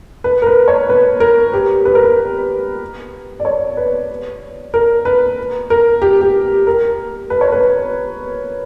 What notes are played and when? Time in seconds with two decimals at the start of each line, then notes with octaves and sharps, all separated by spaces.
0.24 B4
0.42 A#4
0.46 B4
0.68 C#5
0.89 B4
1.20 A#4
1.53 G4
1.85 B4
1.95 A#4
2.05 B4
3.40 D5
3.45 C#5
3.77 B4
4.74 A#4
5.05 B4
5.70 A#4
6.02 G4
6.21 G4
6.67 A#4
7.30 B4
7.41 C#5
7.52 B4